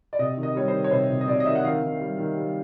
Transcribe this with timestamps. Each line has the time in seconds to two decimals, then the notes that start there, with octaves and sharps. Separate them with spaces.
0.13 D5
0.19 C3 D#5
0.37 D#3
0.43 D#5
0.55 G3 C#5
0.68 C5
0.73 D#3
0.84 C#5
0.91 C3 C5
1.10 C3
1.21 D#5
1.28 C3 D5
1.40 D#5
1.46 D#3 E5
1.55 F#5
1.64 D#3 F5
1.82 D#3
2.00 G3
2.18 D#3
2.36 G3